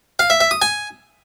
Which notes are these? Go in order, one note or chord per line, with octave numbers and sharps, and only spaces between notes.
F5
E5
E5
D#6
G#5